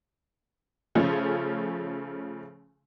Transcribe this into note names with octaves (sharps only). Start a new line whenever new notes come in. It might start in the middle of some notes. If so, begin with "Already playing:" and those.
C#3 F3 A3 C#4